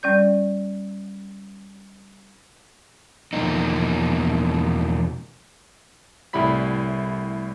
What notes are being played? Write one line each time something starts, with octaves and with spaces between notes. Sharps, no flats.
G3 C#4 D5 G6
E2 B2 F3 A#3 D#4
C2 A2 G3 E4 B5 B6